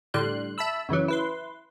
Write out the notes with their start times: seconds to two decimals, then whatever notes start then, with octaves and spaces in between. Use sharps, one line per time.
0.14 A2 D3 G3 C6 F#6
0.58 E5 A5 B5 E6
0.89 F#2 C#3 E3 F#3
1.08 E4 B4 C6